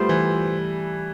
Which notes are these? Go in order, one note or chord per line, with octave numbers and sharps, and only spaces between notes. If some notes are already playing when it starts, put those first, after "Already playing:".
Already playing: G3 A3 B3 F4 C5
E3